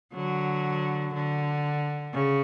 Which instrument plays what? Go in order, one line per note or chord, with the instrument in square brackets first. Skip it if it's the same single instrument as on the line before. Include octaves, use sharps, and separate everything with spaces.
[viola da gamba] D3 F#3
D3
C#3